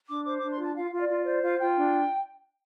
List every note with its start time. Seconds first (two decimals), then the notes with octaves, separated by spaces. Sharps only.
0.08 D4 D6
0.25 C5 D6
0.38 D4 D6
0.50 C6
0.58 F4 A5
0.76 F4 F5
0.92 F4 F5
1.01 D5
1.08 F4
1.25 C5 D5
1.42 F4 F5
1.59 F4 G5
1.76 D4